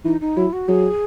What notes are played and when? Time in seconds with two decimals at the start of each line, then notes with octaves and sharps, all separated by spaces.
0.05 E3 D#4
0.21 D#4
0.37 F#3 E4
0.53 F#4
0.69 F#3 G#4